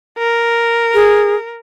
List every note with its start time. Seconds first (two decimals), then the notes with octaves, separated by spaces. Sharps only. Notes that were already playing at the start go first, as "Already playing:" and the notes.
0.18 A#4
0.94 G#4